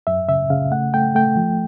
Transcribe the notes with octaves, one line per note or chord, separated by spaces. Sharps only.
F#2 E5
C#3 E5
C#3 F5
A3 F#5
A3 G5
A3 G5
F3